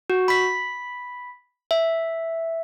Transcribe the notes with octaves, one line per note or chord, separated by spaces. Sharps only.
F#4
B5 B6
E5